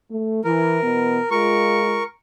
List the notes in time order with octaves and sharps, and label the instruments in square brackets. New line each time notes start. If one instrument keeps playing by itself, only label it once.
[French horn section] A3
[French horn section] E3 [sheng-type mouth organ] A#4
[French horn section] B2 E3 B3
[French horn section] G#3 F4 [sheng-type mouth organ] A#4 C#6